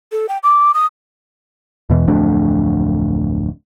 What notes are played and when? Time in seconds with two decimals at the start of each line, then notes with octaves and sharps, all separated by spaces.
0.12 A4
0.29 G5
0.43 D6
0.74 D#6
1.90 E2 B2 E3
2.07 D1 F2 A3 D4